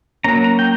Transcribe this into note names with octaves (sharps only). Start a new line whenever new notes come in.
F#3 A#3 C#4 A#5
A#5
G5